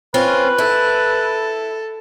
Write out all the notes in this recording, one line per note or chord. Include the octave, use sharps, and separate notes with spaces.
C4 C#4 F4 B4
E4 A4